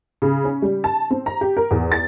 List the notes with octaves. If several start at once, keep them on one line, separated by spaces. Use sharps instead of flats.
C#3
C#4
G3
A5
C4
A#5
G4
A#4
E2
A6